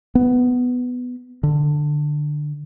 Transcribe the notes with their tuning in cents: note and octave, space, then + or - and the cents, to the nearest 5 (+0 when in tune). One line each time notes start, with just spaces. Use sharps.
B3 +10
D3 +15